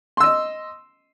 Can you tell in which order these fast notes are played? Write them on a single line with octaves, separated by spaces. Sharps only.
C6 E6 D#5